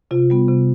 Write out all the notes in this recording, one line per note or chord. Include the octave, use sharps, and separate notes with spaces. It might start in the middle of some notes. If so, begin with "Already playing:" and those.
C3 F4
G3 B3
C3